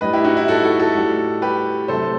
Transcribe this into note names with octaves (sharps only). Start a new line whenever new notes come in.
A2 G3 B4 D#5
E4 G4
D#4 F#4
E4
F#4 A4
F#4 A4
F#4 A4
A2 G3
G4 B4
C3 F#3 A3 A4 C5